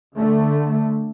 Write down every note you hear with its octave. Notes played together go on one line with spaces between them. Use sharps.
D3 A3